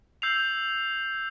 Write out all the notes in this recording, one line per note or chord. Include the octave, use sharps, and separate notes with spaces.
E6 G6 C7 F7